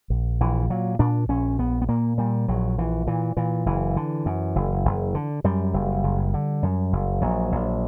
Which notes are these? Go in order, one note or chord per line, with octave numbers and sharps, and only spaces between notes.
A#1
A#1 E3
A#2 F#3
A#2 D4
A#1 C#4
A#1 B3
B3
A#2 A#3
A#2 G3
A#1 F#3
A#1 E3
A#2 E3
A#2 E3
F#1 E3
D3
F#2
F#1
F#1
D3
F#2 G3
F#1
F#1
D3
F#2
F#1
A#1 F#3
A#1